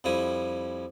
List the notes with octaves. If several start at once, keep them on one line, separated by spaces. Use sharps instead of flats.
F2 F3 G3 E4 D#6